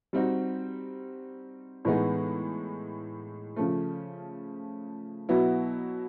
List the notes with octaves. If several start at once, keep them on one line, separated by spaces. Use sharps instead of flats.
G3 C4 D#4 F#4
A2 E3 G#3 B3 D#4
C#3 F3 A3
B2 F#3 B3 E4